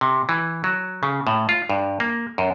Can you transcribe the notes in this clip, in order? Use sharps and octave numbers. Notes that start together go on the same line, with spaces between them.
C3
E3
F#3
C#3
A2
F4
G2
A#3
F#2